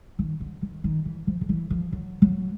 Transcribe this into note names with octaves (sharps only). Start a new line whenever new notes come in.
D#3
D3
D#3
D#3
E3
F3
D#3
E3
F3
F#3
F#3